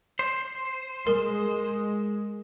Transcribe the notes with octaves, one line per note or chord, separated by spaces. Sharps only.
C5
G#3 A#4